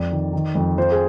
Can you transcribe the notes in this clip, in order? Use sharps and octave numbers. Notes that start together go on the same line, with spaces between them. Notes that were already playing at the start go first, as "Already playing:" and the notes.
Already playing: F2 D5
D#3
D#3
F2
F3 C5
G#4